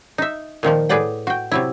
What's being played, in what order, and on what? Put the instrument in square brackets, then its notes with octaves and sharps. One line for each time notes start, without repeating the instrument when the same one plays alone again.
[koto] D#4 E5
A#2 D#3 F3 A#3
A2 G#4 B4 D5 F#5 G5
F#4 G5
C3 F#3 E4